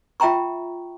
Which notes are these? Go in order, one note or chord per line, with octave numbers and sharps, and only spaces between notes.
F4 E5 G5 A#5 C#6